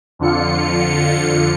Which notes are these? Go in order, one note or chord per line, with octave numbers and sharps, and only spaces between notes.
F2 D3 F4 C#7